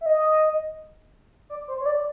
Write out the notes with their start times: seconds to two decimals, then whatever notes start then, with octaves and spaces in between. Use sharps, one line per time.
0.01 E5
0.06 D#5
1.50 D5
1.68 C5
1.80 C#5
1.86 D5